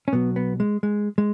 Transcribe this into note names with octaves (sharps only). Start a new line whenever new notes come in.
C#4
B1 B2 F#3 B3
B3
G#3
G#3
G#3